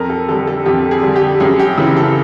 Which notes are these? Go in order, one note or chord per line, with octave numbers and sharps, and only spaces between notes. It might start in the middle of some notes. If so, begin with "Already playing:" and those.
Already playing: F2 A#4
A4
D3 G3 A4
A4
F2 G4
G#4
D3 G3
G4
F#2 G#4
G4
C#3 E3
A4